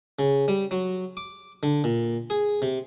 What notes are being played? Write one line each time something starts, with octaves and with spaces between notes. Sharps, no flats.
C#3
G3
F#3
D6
D3
A#2
G#4
C3